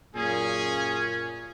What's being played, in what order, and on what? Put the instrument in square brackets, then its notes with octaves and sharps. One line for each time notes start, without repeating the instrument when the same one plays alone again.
[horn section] F#2 A#2 [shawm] C#4 [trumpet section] G#4